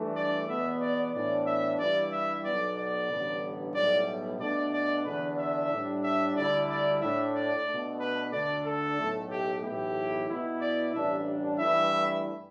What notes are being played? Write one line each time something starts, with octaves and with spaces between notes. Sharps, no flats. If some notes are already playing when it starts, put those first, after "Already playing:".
Already playing: G2 E3 A3 D4
D5
E2 B2 B3 E5
D5
A2 E3 B3 D4 D5
E5
G2 E3 G3 E4 D5
E5
B1 B2 B3 D5
D5
A1 G2 D3 B3 D4
B1 A2 G3 B3 E4 D5
B2 A3 D4 D5
D5
E2 D3 B3 D4 B4
E5
A2 G3 D4
E5
D2 D3 G3 E4 D5
D5
A2 A3 D4 E5
D5
B2 A3 D4
B4
D2 D3 A3 D4 D5
A4
B1 A2 A3
G4
B1 A2 E3 B3 E4 G4
B2 B3 E4
D5
A1 G2 G3 D4 E5
G2 E3 A3 E4 E5